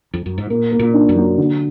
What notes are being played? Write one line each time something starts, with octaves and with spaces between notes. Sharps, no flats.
F2
F#2
G#2
A#2 A#3
A#3
A#2
D4
F#2
F#3
D3